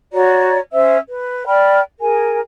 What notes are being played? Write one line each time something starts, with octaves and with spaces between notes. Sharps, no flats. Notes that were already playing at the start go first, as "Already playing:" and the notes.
F#4 C#5 D5 A#5
C#4 C5 E5 E6
B4
D5 G5 B5 F6
G#4 A#4 G#5